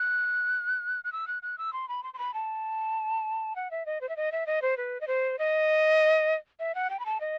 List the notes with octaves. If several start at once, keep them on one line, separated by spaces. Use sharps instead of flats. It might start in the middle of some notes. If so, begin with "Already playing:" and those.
Already playing: F#6
F#6
E6
F#6
F#6
E6
C6
B5
C6
C6
B5
A5
F#5
E5
D#5
C5
E5
D#5
E5
D#5
C5
B4
D#5
C5
D#5
E5
F#5
G5
B5
A5
D#5